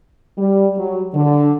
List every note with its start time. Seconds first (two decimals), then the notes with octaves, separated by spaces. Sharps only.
0.38 G3
0.78 F#3
1.15 D3